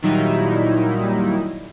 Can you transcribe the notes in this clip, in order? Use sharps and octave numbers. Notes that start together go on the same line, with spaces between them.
A#2 D#3 F#3 G3 D#4 E4